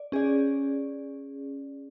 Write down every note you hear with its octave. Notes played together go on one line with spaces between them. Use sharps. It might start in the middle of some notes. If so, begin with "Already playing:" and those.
Already playing: D5
C#4 G#4 D5